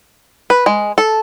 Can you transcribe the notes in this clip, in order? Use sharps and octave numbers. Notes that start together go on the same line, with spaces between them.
B4
G#3
A4